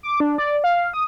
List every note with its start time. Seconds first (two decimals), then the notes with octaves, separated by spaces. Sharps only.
0.03 D6
0.20 D4
0.38 D5
0.64 F5
0.93 D#6